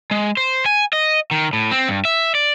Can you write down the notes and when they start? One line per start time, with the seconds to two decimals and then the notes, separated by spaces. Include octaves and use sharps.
0.11 G#3
0.37 C5
0.66 G#5
0.93 D#5
1.31 D#3
1.53 A2
1.71 C4
1.88 G2
2.05 E5
2.35 D5